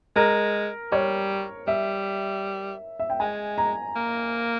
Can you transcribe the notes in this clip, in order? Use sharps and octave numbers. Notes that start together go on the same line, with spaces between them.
G#3 A#4
G3 C#5
G3 E5
E5
G5
G#3 G#5
A#5
A#3